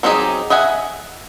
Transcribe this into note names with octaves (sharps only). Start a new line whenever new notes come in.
F#3 C4 D#4 G4 G#4
D#5 E5 F#5 G#5